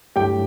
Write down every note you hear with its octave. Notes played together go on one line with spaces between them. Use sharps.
G2 F#3 A3 E4 G4 G5